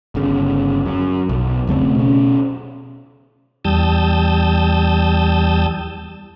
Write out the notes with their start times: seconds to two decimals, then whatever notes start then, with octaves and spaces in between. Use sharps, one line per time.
0.15 G1 C#3
0.86 F#2
1.29 B1
1.67 E1 C#3 A3 C4
1.95 B2 C#4
3.65 E2 G3 A5 D#6 E6 G6